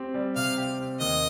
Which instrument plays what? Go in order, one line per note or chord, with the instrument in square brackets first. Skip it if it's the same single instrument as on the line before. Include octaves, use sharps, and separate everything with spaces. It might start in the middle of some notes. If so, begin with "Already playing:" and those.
Already playing: [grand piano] C4 G4
G3
[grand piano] C3 [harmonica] F5
[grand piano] G4
C4
[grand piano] D#2 [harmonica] D#5